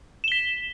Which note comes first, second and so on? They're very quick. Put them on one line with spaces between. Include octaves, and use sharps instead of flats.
E7 G7 B6